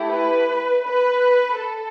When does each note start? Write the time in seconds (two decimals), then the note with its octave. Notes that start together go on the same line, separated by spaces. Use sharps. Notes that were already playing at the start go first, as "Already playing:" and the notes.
Already playing: A3 E4 G4
0.10 B4
0.84 B4
1.59 A4